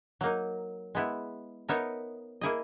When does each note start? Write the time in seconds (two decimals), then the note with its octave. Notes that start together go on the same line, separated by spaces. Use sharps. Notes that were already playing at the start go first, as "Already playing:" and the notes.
0.21 F#3 A#3 D#4
0.95 G#3 B3 E4
1.69 B3 D#4 A#4 C#5 E5
2.41 A#3 E4 G#4 D#5